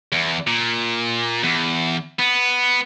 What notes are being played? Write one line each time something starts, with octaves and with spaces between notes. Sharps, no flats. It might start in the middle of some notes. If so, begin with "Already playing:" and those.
E2
A#2
E2
B3